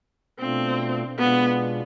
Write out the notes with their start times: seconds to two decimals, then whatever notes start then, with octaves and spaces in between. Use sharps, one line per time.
0.39 B2 A3 C4 D4 F4
1.18 B2 G#3 B3 D4 F4